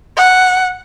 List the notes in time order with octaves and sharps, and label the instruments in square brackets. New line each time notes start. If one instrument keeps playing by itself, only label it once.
[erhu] F#5